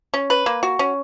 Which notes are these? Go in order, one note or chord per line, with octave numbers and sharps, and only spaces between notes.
C#4
B4
A#3
F#4
C#4